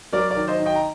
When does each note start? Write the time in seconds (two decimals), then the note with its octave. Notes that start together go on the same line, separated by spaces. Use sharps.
0.13 F#3 A#4 D5
0.30 A#4 D5
0.37 D#3
0.48 C5 D#5
0.60 D#3
0.66 D#5 G5
0.75 A#5